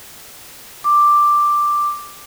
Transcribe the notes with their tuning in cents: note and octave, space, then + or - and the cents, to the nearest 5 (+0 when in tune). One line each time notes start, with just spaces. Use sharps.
D6 +5